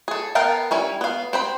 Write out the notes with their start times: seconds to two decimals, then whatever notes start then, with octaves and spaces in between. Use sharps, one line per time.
0.08 G#4 A4
0.35 B3 A#4 F5 G5 A5
0.71 G3 C#4 E4
1.01 B3 F5
1.33 C4 C5 B5